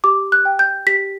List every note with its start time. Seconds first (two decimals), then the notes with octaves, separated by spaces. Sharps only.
0.04 G4 D6
0.32 F#6
0.45 G5
0.59 G6
0.87 G4 B6